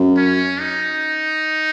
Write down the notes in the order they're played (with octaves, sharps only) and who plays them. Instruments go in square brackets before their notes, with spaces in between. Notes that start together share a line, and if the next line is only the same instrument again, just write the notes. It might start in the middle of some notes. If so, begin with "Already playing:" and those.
Already playing: [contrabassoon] F#2
[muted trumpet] C#4
D#4